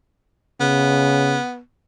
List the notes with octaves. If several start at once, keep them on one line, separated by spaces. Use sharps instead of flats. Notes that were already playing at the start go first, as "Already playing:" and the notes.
C#3 B3